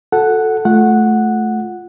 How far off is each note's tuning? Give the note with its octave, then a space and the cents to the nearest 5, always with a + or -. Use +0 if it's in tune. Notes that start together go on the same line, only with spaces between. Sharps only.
F#4 -30 A4 +0 F#5 +0
A3 -15 F4 +0 F#5 -5